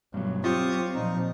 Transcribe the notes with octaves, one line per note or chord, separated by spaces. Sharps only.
G2 B2 F#3
C4 F4 G4 C#6 D#6
A#2 F3 D#4